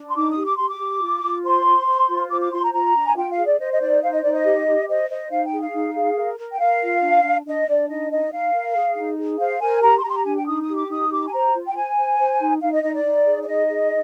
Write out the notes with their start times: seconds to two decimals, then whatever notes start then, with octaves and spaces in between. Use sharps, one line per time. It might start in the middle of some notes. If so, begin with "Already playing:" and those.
Already playing: D4
0.09 C6
0.15 D#4 D6
0.30 D#6
0.36 G4
0.44 D6
0.56 G4 C6
0.68 D6
0.79 G4
1.02 F4
1.23 F4
1.44 C5 C6
1.66 C5
1.87 C5
2.09 F4
2.30 C5 D6
2.41 D6
2.52 F4 C6
2.63 A#5
2.73 F4 A#5
2.95 D4
3.05 G#5
3.17 F4 G5
3.31 F5
3.37 G#4
3.45 D5
3.59 C5 D#5
3.72 D#5
3.81 D#4 D5
4.02 C5 F5
4.12 D#5
4.23 D#4 D5
4.33 D#5
4.45 G4
4.67 G4
4.88 C5 D#5
5.10 C5 D#5
5.31 D#4 F5
5.45 G5
5.53 G#4
5.60 F5
5.74 D#4
5.96 G#4
6.16 A#4
6.39 A#4
6.52 G5
6.60 A#4 F5
6.82 F4
7.02 D4
7.24 D4
7.46 D4 D#5
7.68 D4 D5
7.89 D#4 D#5
8.11 D#4 D#5
8.32 D#4 F5
8.54 A#4
8.75 G#4
8.96 D#4
9.18 G#4
9.39 C5 F5
9.61 A#4 G#5
9.82 G4 A#5
9.97 C6
10.03 G4 A#5
10.10 C6
10.15 A#5
10.25 D4 G#5
10.36 G5
10.47 D#4 D#6
10.62 D#6
10.68 G4
10.76 D6
10.90 D#4 D#6
11.11 G4 D6
11.27 G#5
11.33 C5 A#5
11.54 F4
11.66 G5
11.75 C5 G#5
11.97 C5
12.19 C5
12.40 D#4
12.61 D#4 F5
12.72 D#5
12.83 D#4 D#5
12.94 D5
13.05 D#4
13.26 G#4
13.43 D5
13.47 D#4 D#5
13.69 G#4